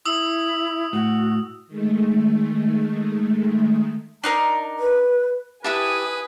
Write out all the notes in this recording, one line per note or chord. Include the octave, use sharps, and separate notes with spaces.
E4 D#6 E6
A2 F#4
D#3 G#3 A3
D4 D#4 A#4 A#5
B4
E4 G4 B4 E5 G#5 A5 D#6